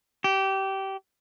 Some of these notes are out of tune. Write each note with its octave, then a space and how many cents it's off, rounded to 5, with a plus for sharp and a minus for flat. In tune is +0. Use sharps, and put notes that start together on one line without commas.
G4 -20